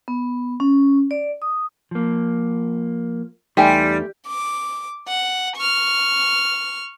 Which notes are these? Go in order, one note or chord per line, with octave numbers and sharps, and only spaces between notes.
B3
C#4
D5
D#6
F3 A#3
E2 G3 A3 D#4 G4 G#5 C6
D6
F#5
C#6 F6